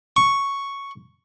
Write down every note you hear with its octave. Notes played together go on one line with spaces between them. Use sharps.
C#6